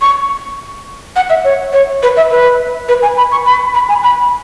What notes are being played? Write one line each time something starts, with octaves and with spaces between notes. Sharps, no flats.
C#6
F#5
E5
C#5
C#5
B4
E5
B4
B4
G#5
B5
C#6
B5
B5
G#5
B5